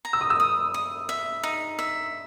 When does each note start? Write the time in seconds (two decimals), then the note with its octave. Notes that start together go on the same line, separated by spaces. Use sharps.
0.05 A#5
0.13 E6
0.21 D#6
0.30 E6
0.40 D#6
0.74 D#6
1.09 E5
1.43 D#4
1.79 E5